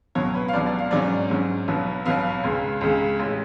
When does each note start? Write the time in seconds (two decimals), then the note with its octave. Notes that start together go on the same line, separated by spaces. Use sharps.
0.15 C#2 B2 F#3 C#5
0.34 B4
0.48 F5
0.53 C#2 B2 F#3 D5
0.66 D5
0.79 F5
0.91 G#2 F#3 C#4 D5
1.29 G#2 F#3 C#4
1.68 B1 B2 F#3 B3
2.05 B1 B2 F#3 B3 F5
2.43 C#2 C#3 G#3
2.81 C#2 C#3 G#3
3.20 A1 G#3